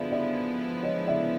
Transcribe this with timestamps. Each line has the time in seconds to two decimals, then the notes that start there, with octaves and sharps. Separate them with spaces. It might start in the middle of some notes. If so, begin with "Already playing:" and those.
Already playing: D3 F3 G#3 B3 E4 D5 E5
0.12 D5 E5
0.83 C#5 D#5
1.07 D5 E5